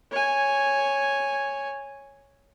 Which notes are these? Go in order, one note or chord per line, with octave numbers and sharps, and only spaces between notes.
C#5 G#5